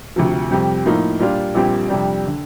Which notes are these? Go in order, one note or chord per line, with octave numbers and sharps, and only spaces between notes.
D2 C3 F3
F2 C3 G3 C4
A2 F3 A#3 D#4
A#2 G3 D4 F4
A#1 A#2 G3 C4 G4
F2 C3 G3 D4
D3